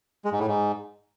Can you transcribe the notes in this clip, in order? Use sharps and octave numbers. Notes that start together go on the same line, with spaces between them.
G#3
G#2
A2
G#2